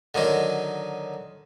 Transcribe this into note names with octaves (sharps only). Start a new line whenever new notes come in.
D3 D#3 F#3 D#4